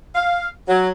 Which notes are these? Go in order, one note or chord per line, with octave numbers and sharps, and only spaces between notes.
F5
F#3